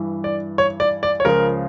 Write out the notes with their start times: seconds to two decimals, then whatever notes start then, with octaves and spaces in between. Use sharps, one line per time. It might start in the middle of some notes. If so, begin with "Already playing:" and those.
Already playing: G2 E3
0.24 D5
0.58 C#5
0.80 D5
1.03 D5
1.20 C#5
1.24 C#2 C#3 F3 A#4